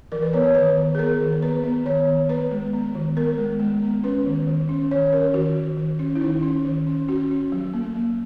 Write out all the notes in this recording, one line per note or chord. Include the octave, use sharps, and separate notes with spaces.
E3 A#4
B4
B3 C#5
C#5
D#3 B4
D#3
G#4
B3 A#4
D#3
B3 B4
B3
D#3 C#5
D#3
B3 B4
G#3
B3
D#3
B3 A#4
G#3
G#3
B3
C#4 B4
D#3
D#3
C#4
D#3 C#5
C#4 A#4
D#3 F#4
D#3
D#3
C#4
E4
D#3 D#4
C#4
D#3
C#4
C#4 F#4
C#4
F#3
A#3
F#3